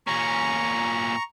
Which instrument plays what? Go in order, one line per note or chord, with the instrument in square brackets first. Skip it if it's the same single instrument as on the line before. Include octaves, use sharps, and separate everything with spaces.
[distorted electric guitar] A#2 C#4 [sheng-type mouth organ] A#5 C#6